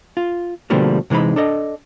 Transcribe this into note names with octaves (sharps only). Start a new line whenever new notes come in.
F4
B2 D3 F3 G3 A3 A#3
C3 E3 G#3 D#4 B5
D4 A4 D#5